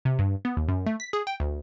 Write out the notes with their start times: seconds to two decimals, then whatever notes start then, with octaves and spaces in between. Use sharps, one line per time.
0.05 C3
0.19 G2
0.45 B3
0.57 D#2
0.68 F#2
0.86 A3
1.00 B6
1.13 G#4
1.27 G5
1.40 D2